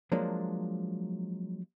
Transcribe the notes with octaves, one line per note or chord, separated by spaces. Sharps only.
F3 F#3 G#3 A#3 D4